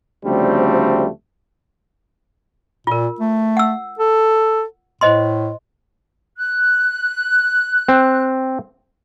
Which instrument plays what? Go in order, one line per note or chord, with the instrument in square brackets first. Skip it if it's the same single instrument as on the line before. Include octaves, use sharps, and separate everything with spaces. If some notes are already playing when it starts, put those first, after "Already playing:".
[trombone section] D2 C#3 F3 G3 A3 C4
[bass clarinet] A#2 [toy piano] F4 A#4
[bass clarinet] A3
[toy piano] F#5 E6
[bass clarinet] A4
[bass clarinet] A2 [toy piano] C5 D#5 C6
[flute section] F#6
[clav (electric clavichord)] C4